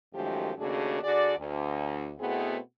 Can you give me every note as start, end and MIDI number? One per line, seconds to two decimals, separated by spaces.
0.13 0.51 42
0.13 0.51 51
0.13 0.51 53
0.13 0.51 56
0.13 0.51 57
0.13 0.51 67
0.58 1.01 39
0.58 1.01 49
0.58 1.01 57
0.58 1.01 62
0.58 1.01 66
0.58 1.01 68
1.02 1.32 50
1.02 1.32 66
1.02 1.32 68
1.02 1.32 74
1.38 2.10 38
2.19 2.57 47
2.19 2.57 57
2.19 2.57 59
2.19 2.57 60
2.19 2.57 64
2.19 2.57 68